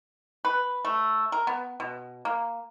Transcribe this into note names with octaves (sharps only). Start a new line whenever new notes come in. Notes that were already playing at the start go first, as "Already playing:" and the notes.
B4
A3
A#4
B3
B2
A#3